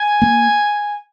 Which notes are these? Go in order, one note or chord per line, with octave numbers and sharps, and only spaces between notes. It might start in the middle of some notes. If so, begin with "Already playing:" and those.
Already playing: G#5
A#3